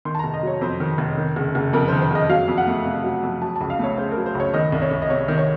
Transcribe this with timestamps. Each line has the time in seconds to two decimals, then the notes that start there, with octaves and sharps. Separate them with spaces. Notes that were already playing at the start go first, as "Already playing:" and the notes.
0.05 D#3 C6
0.15 A5
0.19 F1 A#5
0.34 D#5
0.43 F#3 C#5
0.61 F2 C5
0.80 D#3
0.98 F1
1.17 D#3
1.36 F#1
1.55 F#1
1.73 F2 A#4
1.88 D#3 C5
2.02 C5
2.11 F#1 D#5
2.29 F#3 F5
2.48 F2
2.58 F#5
2.67 A3
2.85 C3
3.04 F#3
3.23 F2
3.42 F#3 A5
3.56 A5
3.61 C#2
3.70 F5
3.79 A3 C#5
3.98 C#3 C5
4.12 A#4
4.17 F#3
4.26 C5
4.35 C#2 C#5
4.54 D#3 D#5
4.72 C2
4.82 C#5
4.91 C2
5.02 D#5
5.10 C3 C#5
5.28 D#3
5.38 C#5